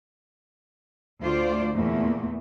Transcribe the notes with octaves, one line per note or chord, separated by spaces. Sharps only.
D2 A3 F4 C5 D5
E2 A#2 A3 A#3